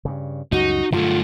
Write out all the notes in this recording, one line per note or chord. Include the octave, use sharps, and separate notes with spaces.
G2 C#3
C#2 F#2 G3 D#4 F#4
G2 D3 F#3 G3 A3 F4